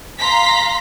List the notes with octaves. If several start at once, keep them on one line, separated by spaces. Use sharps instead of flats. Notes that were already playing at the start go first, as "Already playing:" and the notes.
F5 A#5 C6 B6